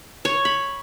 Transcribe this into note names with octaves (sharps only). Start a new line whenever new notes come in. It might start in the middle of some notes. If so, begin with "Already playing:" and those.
C#5
B5